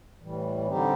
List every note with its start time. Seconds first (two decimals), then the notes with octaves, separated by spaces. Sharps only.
0.18 A2 E3 G3
0.66 D3 G3 C4 D#4 G4